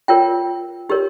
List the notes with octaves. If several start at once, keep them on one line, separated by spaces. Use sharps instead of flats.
F4 A#4 C#5 G5
D#4 G4 A#4 C#5